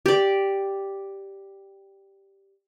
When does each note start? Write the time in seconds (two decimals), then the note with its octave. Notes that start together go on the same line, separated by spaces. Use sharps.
0.06 G4 D5